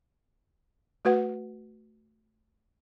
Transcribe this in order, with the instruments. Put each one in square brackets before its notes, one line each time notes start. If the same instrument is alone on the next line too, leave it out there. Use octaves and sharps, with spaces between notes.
[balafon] A3 F#4 B4 F#5